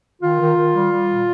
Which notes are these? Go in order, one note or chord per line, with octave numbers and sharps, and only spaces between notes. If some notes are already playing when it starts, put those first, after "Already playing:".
D#3 F4
D#3
D#3
G3
G3
A#2